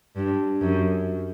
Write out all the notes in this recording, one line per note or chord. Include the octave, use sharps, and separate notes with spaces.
G2
F#2